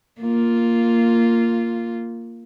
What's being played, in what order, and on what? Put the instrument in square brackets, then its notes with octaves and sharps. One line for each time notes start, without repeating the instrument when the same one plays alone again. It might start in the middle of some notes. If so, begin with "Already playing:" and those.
[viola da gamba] A#3 F4